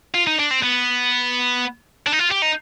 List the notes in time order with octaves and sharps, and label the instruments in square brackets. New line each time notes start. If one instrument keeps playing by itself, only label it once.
[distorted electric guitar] F4
D#4
D4
C4
B3
D4
D#4
F4
G4
D#4